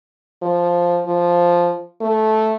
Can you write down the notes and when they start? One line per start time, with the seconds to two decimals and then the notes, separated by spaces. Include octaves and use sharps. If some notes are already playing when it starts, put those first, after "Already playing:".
0.42 F3
1.06 F3
2.01 A3